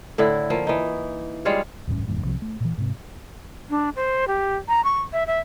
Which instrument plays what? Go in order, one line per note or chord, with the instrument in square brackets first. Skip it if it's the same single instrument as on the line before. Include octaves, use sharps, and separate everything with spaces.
[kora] A2 D3 E4
F3 A#3
E3 D#4
G3 G#3 F4 C#5
[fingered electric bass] E1 A1 G2 C#4
F1 E2 G#2
C2 C3 F3
A3
A#2 E3
G#2 C3
[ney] D4
C5
G4
A#5
C#6
E5
E5